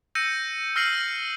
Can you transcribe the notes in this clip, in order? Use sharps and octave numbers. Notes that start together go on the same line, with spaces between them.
E6 G6 A#6 C#7 D#7
E6 F6 A#6 C7 D#7 F#7